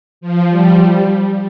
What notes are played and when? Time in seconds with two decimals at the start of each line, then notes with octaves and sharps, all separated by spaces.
0.21 F3
0.50 G3